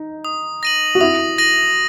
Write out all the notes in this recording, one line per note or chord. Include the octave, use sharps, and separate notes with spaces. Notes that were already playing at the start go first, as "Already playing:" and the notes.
Already playing: D#4
D#6
A#6 D#7 F#7
F#4
E4 D#6
A#6 D#7 F#7